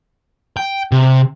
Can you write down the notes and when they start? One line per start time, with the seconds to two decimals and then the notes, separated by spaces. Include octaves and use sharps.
0.57 G5
0.92 C3